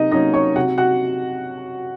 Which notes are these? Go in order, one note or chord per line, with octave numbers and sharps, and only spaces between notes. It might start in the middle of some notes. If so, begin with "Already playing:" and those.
Already playing: C3 F#3 A#3 D#4 D#5
F#3 A#3 C#4 D#4 D#5
C#5 C#6
C3 F#4 F#5
F#4 F#5